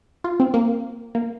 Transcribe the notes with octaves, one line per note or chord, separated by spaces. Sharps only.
F4
C4
A#3
A#3